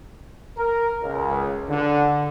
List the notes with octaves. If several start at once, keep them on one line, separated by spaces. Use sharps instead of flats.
A#4
C#2
D3